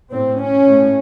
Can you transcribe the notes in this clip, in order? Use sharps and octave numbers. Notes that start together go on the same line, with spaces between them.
A2 C4
C#4
A2